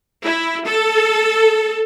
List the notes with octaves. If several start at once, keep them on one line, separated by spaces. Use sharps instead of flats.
E4
A4